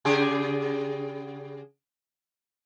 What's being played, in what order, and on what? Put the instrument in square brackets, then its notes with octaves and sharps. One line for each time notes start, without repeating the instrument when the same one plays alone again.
[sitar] C#3 G4 G#4